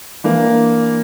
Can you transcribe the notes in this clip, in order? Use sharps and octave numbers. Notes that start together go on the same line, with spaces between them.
E3 A#3 D4